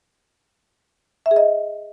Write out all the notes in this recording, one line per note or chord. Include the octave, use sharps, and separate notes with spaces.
E5
G#4
D#5